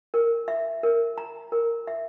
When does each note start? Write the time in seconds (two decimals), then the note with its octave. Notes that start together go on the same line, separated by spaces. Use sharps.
0.14 A#4
0.48 E5
0.83 A#4
1.18 A#5
1.52 A#4
1.87 E5